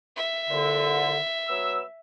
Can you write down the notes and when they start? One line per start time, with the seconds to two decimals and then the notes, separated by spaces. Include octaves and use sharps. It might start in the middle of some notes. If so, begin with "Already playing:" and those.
0.17 E5
0.50 C2 A#2 D3
1.48 F#3 B3 E6